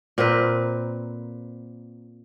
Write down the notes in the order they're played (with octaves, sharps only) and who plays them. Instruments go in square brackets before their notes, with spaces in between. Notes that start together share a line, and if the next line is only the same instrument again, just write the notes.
[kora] A#2 C4 A#4 B4